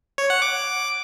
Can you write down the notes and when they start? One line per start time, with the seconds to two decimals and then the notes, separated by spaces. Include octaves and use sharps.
0.18 C#5
0.30 F#5
0.42 D6